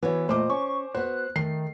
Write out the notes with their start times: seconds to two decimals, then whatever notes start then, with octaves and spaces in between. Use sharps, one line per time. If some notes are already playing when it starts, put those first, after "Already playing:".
0.03 E3 B3 F#4 C#5
0.29 A#2 A3 C5 D#5 D6
0.50 C#4 C#6
0.94 B3 F#4 C5 F#6
1.36 D#3 A3 C7